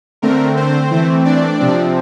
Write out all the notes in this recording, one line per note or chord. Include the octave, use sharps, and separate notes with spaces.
D3 A3 C4 A#4
C4 C5
E3 A3 C4
D4 D5
C3 F3 C4